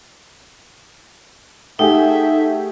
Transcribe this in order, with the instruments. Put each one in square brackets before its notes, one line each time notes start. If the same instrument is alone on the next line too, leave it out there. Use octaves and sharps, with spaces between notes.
[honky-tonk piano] A3 G4 G#4 [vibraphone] D#4 [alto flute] E5 [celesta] F#5 G5